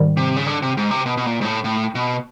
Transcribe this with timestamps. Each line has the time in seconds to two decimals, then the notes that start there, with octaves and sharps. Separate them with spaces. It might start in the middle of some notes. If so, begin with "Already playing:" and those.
Already playing: G#2 D#3 G3
0.17 C3
0.36 C#3
0.47 D3
0.62 C3
0.77 G#2
0.91 C3
1.06 B2
1.17 B2
1.26 A#2
1.41 G#2
1.45 A2
1.64 A2
1.95 B2